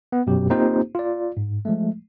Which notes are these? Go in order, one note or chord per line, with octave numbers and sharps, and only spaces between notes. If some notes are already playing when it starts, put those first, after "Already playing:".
B3
F#2 B2 F#3 G4
A#3 C4 D#4 F4 G4 C5
F4 D5
G#2
F3 G#3 A3